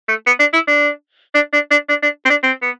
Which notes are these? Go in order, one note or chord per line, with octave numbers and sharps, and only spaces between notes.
A3
B3
D4
E4
D4
D4
D4
D4
D4
D4
C4
D4
C4
B3